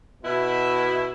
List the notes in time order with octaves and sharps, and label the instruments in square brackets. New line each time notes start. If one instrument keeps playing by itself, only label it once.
[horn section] B2 E4